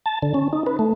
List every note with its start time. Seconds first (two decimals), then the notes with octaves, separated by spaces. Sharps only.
0.06 A5
0.22 D3
0.34 C#4
0.53 D#4
0.67 B4
0.79 A3